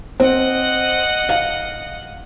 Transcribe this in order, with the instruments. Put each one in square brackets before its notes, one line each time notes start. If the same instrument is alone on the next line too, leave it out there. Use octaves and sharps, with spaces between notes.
[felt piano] C4 [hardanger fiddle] D#5 F#5
[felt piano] F5